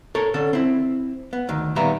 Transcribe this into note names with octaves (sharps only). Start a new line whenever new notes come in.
A4 A#4 C#5
D3 C#4 A4
C4 E4
B3
D2 D#3
A#2 D#3 G3 B3 E5 A#5